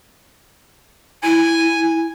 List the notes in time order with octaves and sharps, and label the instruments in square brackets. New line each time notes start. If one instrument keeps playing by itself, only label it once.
[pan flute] E4 [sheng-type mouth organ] G#5